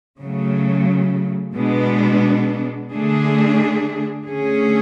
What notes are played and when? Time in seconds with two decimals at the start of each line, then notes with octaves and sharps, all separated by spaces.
0.19 C#3 F#3 A3
1.56 B2 G#3 B3 D4
2.91 D3 A3 D4 G#4
4.27 D3 A3 C#4 G#4